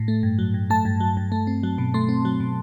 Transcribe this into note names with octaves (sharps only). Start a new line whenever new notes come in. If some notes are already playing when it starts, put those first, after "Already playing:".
Already playing: A2
A3
G2
F#3
G2
A3 A5
G2
F#3
G2
A3
C4
F#3
B2
A3 C6
C4
F#3
B2